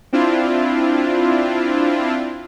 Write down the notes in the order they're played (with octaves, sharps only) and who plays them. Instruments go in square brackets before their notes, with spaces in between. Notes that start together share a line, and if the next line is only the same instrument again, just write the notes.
[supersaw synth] C4 D4 E4 F4